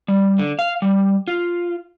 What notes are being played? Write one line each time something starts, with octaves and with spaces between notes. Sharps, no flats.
G3
D3
F5
G3
F4